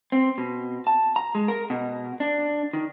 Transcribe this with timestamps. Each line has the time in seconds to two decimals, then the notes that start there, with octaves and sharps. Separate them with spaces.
0.12 C4
0.38 B2
0.87 A5
1.16 A#5
1.35 G#3
1.48 A#4
1.70 B2
2.20 D4
2.73 D#3